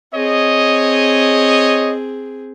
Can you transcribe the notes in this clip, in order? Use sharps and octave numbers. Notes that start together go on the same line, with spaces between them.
C4 G#4 C#5 D#5